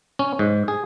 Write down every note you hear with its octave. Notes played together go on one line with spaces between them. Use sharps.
C#4
G#2
G#4